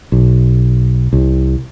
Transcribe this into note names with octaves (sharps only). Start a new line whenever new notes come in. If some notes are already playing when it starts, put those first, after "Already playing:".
B1
C2